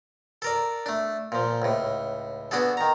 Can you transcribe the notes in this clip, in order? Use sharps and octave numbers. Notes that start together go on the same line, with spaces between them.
A4 A#4 D5
A3 D4
A#2 F3
C#2 A2
B3 D4 F#4 G#4 A4
D#3 A#5